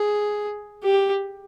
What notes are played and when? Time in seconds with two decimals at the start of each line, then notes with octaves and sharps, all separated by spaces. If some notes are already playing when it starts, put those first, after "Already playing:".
Already playing: G#4
0.83 G4